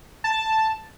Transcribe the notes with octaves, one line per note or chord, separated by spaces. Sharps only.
A5